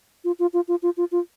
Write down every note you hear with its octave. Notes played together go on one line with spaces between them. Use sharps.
F4
F4
F4
F4
F4
F4
F4